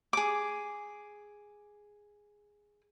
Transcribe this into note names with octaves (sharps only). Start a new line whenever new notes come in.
G#4 D6